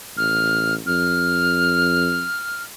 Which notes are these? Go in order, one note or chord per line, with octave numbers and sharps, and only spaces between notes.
A1 F6
F2 F6